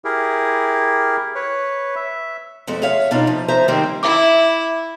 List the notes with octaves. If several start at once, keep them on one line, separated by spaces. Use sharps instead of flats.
E4 G4 G#4 A#4
B4 C#5
E5
F2 G#3 A3
G#4 C#5 E5 F5
B2 D4 D#4 F4
F3
F3 C5 E5 A#5
D#3 G3 G#3 A#3 C4
E4 E5 D6